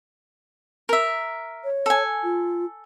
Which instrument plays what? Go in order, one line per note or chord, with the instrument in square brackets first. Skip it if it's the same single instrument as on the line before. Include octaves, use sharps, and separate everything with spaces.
[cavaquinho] A#4 E5
[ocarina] C#5
[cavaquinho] A4 G#5
[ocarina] F4